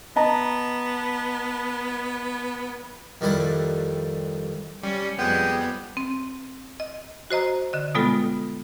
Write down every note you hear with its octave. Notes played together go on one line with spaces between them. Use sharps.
B3 D#5 A5 A#5
F2 D#3 G3 E4 D5 F#5
G3 C#4 D5
F2 G3 G#3 B3 G5
C4
D#5
F#4 C5 D#5 A#5
D3 D#5
B2 G3 G#3 B3 F4 A4